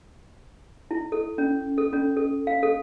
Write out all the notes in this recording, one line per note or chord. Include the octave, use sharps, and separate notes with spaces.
E4
A4
C#4
A4
C#4
A4
F5
A4